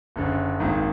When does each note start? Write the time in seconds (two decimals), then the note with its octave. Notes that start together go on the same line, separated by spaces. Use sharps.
0.16 F#1 F#2 D3
0.60 G#1 G#2 D#3 A#3